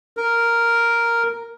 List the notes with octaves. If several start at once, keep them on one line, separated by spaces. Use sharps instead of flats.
A#4